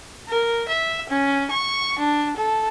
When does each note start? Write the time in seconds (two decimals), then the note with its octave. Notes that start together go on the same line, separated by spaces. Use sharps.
0.28 A#4
0.68 E5
1.09 C#4
1.51 C#6
1.99 D4
2.37 A4